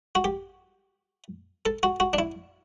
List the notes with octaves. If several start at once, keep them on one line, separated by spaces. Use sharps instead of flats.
F#4
G4
A4
F#4
F#4
D4
E4